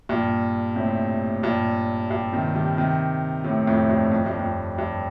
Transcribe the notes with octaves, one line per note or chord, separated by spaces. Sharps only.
G2 A#2
A2 C3
G2 A#2
G2
C3 D#3
D#3 G3
C3 D#3
A2 C3
F2 A2
G2
F2
G2
F2
G2